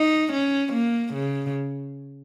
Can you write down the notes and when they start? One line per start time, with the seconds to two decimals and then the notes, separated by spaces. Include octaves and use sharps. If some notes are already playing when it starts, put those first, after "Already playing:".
Already playing: D#4
0.33 C#4
0.73 A#3
1.14 C#3